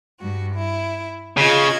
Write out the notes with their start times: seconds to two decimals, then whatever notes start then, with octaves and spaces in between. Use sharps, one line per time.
0.20 G2 F#4
0.54 E4
1.37 C#3 F4 D#5 G#6